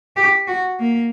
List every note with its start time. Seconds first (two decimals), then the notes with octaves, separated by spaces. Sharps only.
0.16 G4
0.48 F#4
0.79 A#3